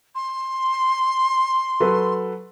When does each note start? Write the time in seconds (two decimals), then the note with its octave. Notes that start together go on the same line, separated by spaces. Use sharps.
0.15 C6
1.80 F#3 A4 B4